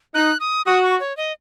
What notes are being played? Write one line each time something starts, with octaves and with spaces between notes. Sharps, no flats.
D#4 F#6
D#6
F#4 D#6
C#6
C#5
D#5